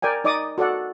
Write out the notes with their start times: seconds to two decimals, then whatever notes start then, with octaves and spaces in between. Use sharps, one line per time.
0.02 A#4 D5 G5 G#5
0.24 D#4 D5 D#5 D6 D#6
0.58 F#4 A4 D5 F#5